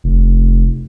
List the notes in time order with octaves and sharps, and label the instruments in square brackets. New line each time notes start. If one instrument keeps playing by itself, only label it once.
[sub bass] F1